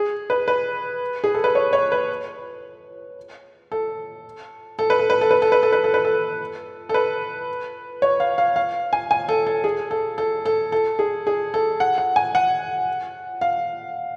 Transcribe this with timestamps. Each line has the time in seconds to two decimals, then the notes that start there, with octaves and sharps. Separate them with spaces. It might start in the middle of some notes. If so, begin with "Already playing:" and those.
Already playing: G#4
0.30 B4
0.48 B4
1.24 G#4
1.34 A4
1.44 B4
1.55 C#5
1.73 C#5
1.92 B4
3.72 A4
4.79 A4
4.90 B4
4.99 A4
5.10 B4
5.21 A4
5.31 B4
5.42 A4
5.52 B4
5.63 A4
5.73 B4
5.84 A4
5.94 B4
6.05 A4
6.89 A4
6.94 B4
8.02 C#5
8.20 F5
8.38 F5
8.56 F5
8.93 G#5
9.11 G#5
9.29 A4
9.47 A4
9.64 G#4
9.91 A4
10.18 A4
10.46 A4
10.72 A4
10.99 G#4
11.27 G#4
11.54 A4
11.80 F#5
11.98 F#5
12.16 G#5
12.35 F#5
13.41 F5